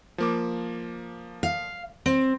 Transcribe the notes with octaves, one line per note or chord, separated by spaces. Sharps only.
F3 A#3 D6
F5
C4